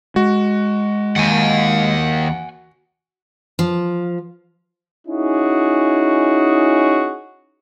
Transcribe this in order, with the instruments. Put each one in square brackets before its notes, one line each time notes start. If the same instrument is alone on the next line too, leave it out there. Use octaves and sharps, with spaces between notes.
[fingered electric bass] G#3 [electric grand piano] F#4
[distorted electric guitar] D#2 [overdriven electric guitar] F#5 G#5
[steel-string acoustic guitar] F3
[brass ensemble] C#4 D#4 E4 F#4 G#4